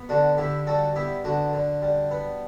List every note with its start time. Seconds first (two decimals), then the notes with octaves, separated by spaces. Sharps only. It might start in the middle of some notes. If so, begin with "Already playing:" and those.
Already playing: B3
0.09 D3 D4 F#4
0.38 D3 E4 G4
0.67 G3 F#4 A4
0.96 B3 E4 G4
1.24 D3 D4 F#4
1.53 D3
1.82 G3
2.11 B3